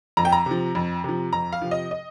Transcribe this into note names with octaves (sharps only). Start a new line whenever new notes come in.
F2 A#5
G5
A#5
C3 F3
F2
C3 F3
F2 A#5
F5
C3 F3
D#5
D#5